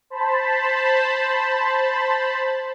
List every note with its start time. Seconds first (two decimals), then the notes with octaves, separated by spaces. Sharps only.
0.10 C5 A5 B5